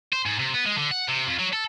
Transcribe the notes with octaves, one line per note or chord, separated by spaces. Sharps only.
C5
G#2
C3
B3
G#3
D3
F#5
C3
F2
F#3
A4